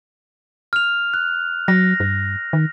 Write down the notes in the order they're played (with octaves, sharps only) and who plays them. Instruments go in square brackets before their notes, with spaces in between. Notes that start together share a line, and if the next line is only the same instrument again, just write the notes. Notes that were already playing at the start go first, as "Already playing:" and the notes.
[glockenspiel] F6 F7
F#6
[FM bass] F#3 [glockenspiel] A#6
[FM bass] G2
D#3